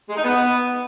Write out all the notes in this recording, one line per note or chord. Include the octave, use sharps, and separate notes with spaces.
G#3
D#4
B3